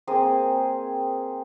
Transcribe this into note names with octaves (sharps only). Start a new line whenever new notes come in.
A#3 C4 G#4 D#6